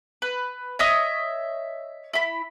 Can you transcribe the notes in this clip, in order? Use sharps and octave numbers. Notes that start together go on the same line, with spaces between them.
B4
C#5 D#5 E5 D#6
E4 B5